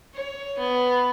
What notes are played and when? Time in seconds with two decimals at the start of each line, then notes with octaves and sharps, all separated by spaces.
0.14 C#5
0.59 B3